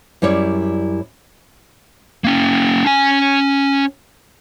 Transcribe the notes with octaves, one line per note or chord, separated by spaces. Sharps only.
F#2 G3 E4 C#5 D5
A#3 C#4
C#4 G#5